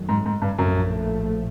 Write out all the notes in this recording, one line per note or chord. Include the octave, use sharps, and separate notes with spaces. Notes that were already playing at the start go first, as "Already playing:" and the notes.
Already playing: F#2 D#3 F#3 A3
G#2
G#2
G2
A#1 F#2 A2 F3 A3